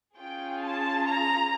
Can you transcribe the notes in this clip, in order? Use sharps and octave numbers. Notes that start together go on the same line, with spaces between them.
C#4 F4 G#4 G5
A5
A#5